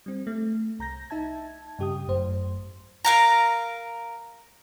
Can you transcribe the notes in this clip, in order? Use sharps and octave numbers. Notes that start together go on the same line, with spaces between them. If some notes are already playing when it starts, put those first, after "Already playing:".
G3 C4
A3
C2 A#5 G6 A#6
D#4 E5 A5 G#6
G2 C#3 G4 G5 D#6
G#1 F#2 A3 C5
A#4 F5 A#5